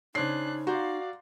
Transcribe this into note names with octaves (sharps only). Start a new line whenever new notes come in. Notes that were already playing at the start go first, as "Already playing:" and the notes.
C#3 D4 D#4 C5 C#5 F#6 C7
F#4 D5 F5 A#5 C6 G6